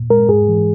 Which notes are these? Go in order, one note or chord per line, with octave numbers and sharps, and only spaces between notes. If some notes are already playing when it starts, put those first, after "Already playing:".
Already playing: A#2
G#3 A#4
G#2 G#4
E3